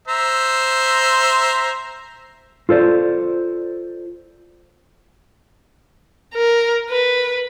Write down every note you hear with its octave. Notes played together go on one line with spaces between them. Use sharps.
C5 E5 A#5
F4 A4 C5 D5
A#4
B4